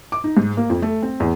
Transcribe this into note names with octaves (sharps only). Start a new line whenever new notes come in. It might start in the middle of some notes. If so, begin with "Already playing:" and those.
D6
D#4
G#2
A#3
F2
A3
C4
E2